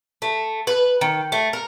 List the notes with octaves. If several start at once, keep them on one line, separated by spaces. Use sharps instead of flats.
A3
B4
D#3
A3
A#4